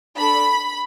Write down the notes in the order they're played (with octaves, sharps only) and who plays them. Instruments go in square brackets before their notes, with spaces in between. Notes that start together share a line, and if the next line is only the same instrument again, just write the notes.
[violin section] D4 A4 B5